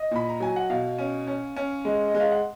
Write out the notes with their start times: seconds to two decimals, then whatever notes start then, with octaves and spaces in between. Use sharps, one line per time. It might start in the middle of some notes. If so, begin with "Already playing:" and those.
Already playing: D#5
0.11 A#2 B5
0.29 A#5
0.40 F#3 G#5
0.56 F#5
0.70 B2 F5
0.98 C#4
1.27 C#4
1.56 C#4
1.85 G#3
2.08 D#5
2.15 G#3
2.20 F5
2.31 F#5